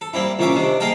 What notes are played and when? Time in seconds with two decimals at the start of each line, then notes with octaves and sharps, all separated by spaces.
0.01 A4
0.13 G3 A#3 C4 E4
0.39 C2 A#2 A#3 C#4 E5 D6
0.55 C3 D#3 D4
0.80 A#3 G#4 D#5 F5 G5 A5